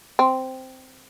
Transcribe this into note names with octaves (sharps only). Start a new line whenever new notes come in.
C4